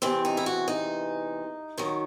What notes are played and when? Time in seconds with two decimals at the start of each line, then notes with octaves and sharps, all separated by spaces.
0.02 E2 C3 E3 C4
0.25 D#4
0.37 E4
0.46 F#4
0.68 D#4
1.78 F#2 D#3 F#3